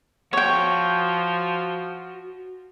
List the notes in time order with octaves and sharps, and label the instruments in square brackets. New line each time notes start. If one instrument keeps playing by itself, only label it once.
[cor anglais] F3 [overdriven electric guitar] F#4 [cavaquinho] C#5 G5